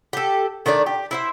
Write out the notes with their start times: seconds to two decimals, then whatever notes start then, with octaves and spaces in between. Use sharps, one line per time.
0.13 G4 A4
0.66 D#3 A3 D4 D5
0.86 G4
1.11 E4 C5 E5